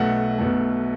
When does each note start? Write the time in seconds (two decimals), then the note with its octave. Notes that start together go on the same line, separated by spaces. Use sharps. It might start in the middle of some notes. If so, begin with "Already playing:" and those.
Already playing: B1 B2 A3 F#5
0.38 B1 B2 A3